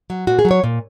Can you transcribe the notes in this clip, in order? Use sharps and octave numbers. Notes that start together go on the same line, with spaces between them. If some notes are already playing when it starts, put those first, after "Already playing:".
F#3
A#2 F#4
G#4
F#3
C#5
A#2